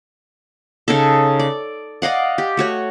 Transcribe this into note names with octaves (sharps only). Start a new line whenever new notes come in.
C#3 C#4 D#4 A4
D5
D5 D#5 F5 F#5
G4
A3 F#4 C#5